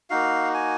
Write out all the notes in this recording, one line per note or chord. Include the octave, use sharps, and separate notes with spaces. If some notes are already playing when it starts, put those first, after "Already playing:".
A#3 D#4 F#4 F5
G#5